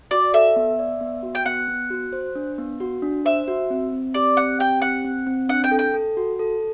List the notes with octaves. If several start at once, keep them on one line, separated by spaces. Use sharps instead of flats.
F#4 D5
A4 E5
B3
D5
B3
F#4
G5
B3 F#5
B3
F#4
C5
D4
B3
F#4
D4
C5 E5
F#4
C4
C4
G4 D5
C4 F#5
G4 G5
C4 F#5
C4
C4
D4 F#5
G5
A4
G5
A4
F#4
A4